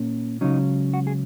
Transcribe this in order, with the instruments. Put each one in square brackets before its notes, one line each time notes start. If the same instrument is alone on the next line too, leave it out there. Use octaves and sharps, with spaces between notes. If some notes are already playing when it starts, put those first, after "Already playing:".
Already playing: [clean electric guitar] A#2 A#3 C#4
C#2 C#3 F#3 C#4 D#4
F#4
G#4